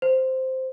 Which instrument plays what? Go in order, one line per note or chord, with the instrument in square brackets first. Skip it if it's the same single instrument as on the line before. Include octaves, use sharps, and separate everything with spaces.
[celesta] C5